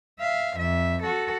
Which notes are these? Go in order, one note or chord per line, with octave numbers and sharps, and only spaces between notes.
E5 F5
F2 E5
F#4 A4